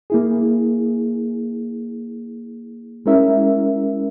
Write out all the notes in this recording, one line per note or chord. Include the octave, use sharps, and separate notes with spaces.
A#3 E4 G#4
G#3 C#4 E4 A#4 E5